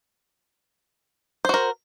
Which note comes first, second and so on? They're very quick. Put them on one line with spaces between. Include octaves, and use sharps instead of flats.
C5 F#4 A#4